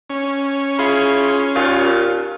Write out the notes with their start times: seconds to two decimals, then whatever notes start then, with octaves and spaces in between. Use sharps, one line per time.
0.10 C#4
0.79 E4 F4 G#4
1.55 D#2 A#2 F4